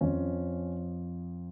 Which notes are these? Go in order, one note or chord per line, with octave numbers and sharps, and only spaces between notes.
F2 F3 C#4